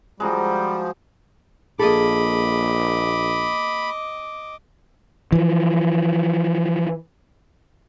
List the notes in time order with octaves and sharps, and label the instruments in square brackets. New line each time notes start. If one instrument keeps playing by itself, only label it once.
[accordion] F3 [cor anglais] G3 [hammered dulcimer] G#3 D#4 F#4
[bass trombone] A#1 [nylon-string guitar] A#3 G#4 A4 [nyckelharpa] D#5 D6 [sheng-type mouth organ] B5
[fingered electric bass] E3 F3